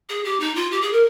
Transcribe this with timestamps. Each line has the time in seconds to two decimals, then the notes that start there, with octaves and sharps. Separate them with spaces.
0.09 G#4
0.24 G4
0.40 D#4
0.55 F4
0.71 G4
0.82 G#4
0.92 A#4